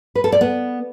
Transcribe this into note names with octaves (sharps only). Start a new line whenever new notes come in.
B4
A4
D5
B3